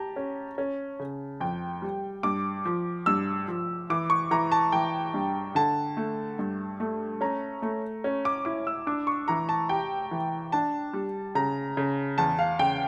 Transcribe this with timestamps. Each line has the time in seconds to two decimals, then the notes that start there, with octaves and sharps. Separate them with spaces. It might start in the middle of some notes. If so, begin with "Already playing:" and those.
Already playing: G4 A5 A#5
0.16 C#4
0.58 C#4
1.00 C#3
1.40 F2 G5
1.82 G3
2.23 G2 D6
2.65 F3
3.06 G2 E6
3.48 F3
3.90 E3 D6
4.10 C#6
4.31 E3 A#5
4.52 A5
4.72 E3 G5
5.14 G2
5.55 D3 A5
5.97 A3
6.39 G2
6.80 A3
7.21 C#4 A#5
7.62 A3
8.04 C#4
8.25 D6
8.45 E4 D6
8.67 E6
8.87 D4 D6
9.07 C#6
9.28 E3 A#5
9.49 A5
9.69 G4 G5
10.11 E3
10.52 D4 A5
10.93 G3
11.35 C#3 A#5
11.77 C#3
12.18 E2 A5
12.39 F5
12.59 C#3 G5